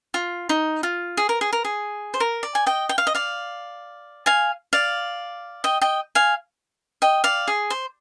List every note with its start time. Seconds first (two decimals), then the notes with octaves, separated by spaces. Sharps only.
0.14 F4
0.49 D#4
0.83 F4
1.17 G#4
1.29 A#4
1.41 G#4
1.53 A#4
1.65 G#4
2.14 C5
2.20 A#4
2.43 D5
2.55 G#5
2.66 D#5 G5
2.89 G5
2.98 F5
3.07 D#5
3.15 D5 F5
4.26 F5 G#5
4.73 D5 F5
5.64 D#5 G5
5.82 D#5 G5
6.15 F5 G#5
7.02 D#5 G5
7.24 D5 F5
7.48 G#4
7.70 C5